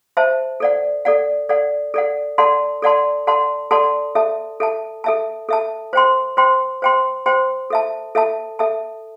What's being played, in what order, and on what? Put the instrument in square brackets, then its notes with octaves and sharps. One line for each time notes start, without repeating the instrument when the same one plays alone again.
[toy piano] C5 E5 A5
A4 D5 F#5
A4 D5 F#5
A4 D5 F#5
A4 D5 F#5
A4 D5 F#5 A5 C6
A4 D5 F#5 A5 C6
A4 D5 F#5 A5 C6
A4 D5 F#5 A5 C6
A4 E5 A5
A4 E5 A5
A4 E5 A5
A4 E5 A5
C5 G5 C6
C5 G5 C6
C5 G5 C6
C5 G5 C6
A4 E5 A5
A4 E5 A5
A4 E5 A5